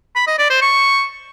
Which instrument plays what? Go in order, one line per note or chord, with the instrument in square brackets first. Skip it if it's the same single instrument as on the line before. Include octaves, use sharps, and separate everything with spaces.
[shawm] B5
D#5
D5
C5
C#6